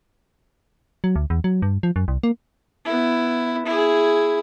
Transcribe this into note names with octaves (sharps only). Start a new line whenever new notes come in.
F#3
D2
E2
F#3
G2
F3
F#2
C2
A#3
B3 E4
E4 G#4